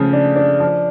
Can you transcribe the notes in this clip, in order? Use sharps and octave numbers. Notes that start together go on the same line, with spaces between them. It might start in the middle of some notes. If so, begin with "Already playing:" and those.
Already playing: C#3 F3 A3
D4
D4
F3